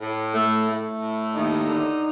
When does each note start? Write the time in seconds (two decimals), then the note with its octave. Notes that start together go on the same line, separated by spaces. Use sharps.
0.01 A2
0.34 A3
0.68 A3
1.01 A2
1.34 D#2 D#4
1.68 D3